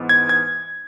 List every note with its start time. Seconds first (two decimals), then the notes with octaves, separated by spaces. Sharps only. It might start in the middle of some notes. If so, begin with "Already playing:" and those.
Already playing: G#2 E3 B3
0.09 G#6
0.29 G#6